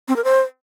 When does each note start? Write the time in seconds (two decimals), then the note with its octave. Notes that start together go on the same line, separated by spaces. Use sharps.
0.08 C4
0.16 A#4
0.24 C5